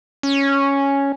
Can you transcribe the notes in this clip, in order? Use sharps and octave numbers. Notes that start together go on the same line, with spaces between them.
C#4